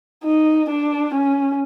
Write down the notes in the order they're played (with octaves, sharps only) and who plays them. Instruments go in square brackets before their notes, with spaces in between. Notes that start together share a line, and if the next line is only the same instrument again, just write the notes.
[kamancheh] D#4
D4
C#4